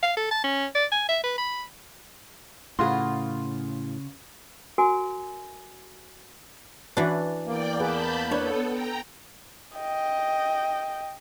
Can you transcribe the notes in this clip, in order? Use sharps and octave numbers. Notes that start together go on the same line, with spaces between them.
F5
A4
A5
C#4
D5
G#5
E5
B4
B5
A2 C#3 F4 F#4 G#4 B4 C6
F#4 A#4 G#5
E3 D4 E4 F#4 B4
E2 A#3 D5 G5 D6
G#4 B4 A5 B5 G6
B3 D4 A4 B4 C#5
G5 A#5
D#5 G5